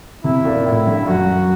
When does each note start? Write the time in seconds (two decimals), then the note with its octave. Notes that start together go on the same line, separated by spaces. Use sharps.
0.24 C3 E4
0.45 A#2
0.66 A2 E4
0.87 G2
1.07 F#2 F#4